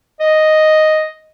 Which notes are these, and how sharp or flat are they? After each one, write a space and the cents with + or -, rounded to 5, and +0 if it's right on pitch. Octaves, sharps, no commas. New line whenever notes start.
D#5 +0